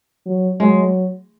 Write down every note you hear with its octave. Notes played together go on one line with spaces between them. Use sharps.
F#3
F#3 G#3